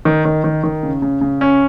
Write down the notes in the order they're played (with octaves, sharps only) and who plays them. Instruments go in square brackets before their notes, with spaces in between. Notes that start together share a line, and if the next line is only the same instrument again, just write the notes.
[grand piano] D#3
D#3
D#3
D#3
C#3
C#3
C#3
C#4